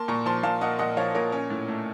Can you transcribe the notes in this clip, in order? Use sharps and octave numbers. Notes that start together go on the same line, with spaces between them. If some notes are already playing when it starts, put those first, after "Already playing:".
Already playing: A#3 A5 C6
A#2 A#5 C#6
F3 A5 C6
A#2 F5 A5
A#3 D#5 F#5
A#2 D#5 F#5
F3 C#5 F5
A#2 A#4 C#5
C#4
A2
A3